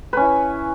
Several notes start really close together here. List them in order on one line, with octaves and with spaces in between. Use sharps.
B4 C#4 E4